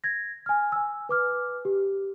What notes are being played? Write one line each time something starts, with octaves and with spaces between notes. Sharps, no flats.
G#6 A#6
G#5 F6
G#5 E6
B4 D6 F6
G4